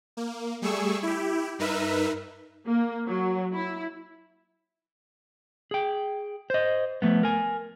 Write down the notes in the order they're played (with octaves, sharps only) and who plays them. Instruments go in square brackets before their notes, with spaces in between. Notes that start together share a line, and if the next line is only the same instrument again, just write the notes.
[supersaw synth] A#3
G3 A3 G#4 C#6 E6
E4 G4
G2 D#4 A#4 B4 E5
[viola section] A#3
F#3
E4
[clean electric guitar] G#4 G5
C5 D#5
F3 A3 B3
A#4 G#5